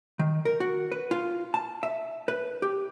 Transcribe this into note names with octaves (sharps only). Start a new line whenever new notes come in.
D#3
A#4
F#4
B4
F4
A5
E5
B4
G4